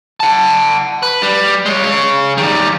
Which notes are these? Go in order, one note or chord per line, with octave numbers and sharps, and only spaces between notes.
F#5 A5
B4
G3
G#3 C#5
G#4 C#5
D#3 G3